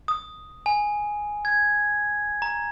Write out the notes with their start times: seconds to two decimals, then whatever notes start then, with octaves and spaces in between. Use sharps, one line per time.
0.08 D#6
0.66 G#5
1.45 G#6
2.42 A#5